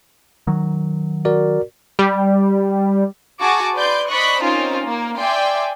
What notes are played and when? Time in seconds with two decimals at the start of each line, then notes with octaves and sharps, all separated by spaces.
0.47 D#3 F#3
1.25 F#4 A#4 D5
1.99 G3
3.41 F#4 G#4 A5 C#6 D6
3.75 B4 D5 C6 G6 D7
4.08 C5 D5 D#5 B5 C#6 F#6
4.42 C4 C#4 D#4 F4 A#4 C5
4.85 A#3
5.17 D5 E5 G5 G#5 C6 D6